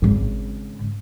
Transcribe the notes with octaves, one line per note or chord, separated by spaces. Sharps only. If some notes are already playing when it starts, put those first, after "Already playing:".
G#1 C#3